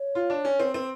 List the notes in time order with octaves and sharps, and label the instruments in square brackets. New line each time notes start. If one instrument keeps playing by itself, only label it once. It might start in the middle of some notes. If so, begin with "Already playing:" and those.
Already playing: [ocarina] C#5
[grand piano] F4
D4
C#4
C4
C4